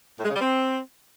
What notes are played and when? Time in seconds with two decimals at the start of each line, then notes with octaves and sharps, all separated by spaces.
0.19 A2
0.24 G#3
0.30 C#3
0.36 G3
0.41 C4